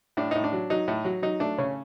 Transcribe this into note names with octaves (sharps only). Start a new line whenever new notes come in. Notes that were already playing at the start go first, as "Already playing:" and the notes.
A2 D4
A2 D#4
D4
F#3
F#3 D#4
A2
F#3
F#3 D#4
A3 D4
C#3 C#4